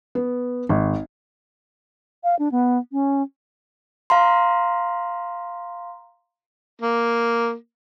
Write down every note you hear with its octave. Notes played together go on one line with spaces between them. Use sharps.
B3
G#1
F5
D4
B3
C#4
F5 A#5 C6
A#3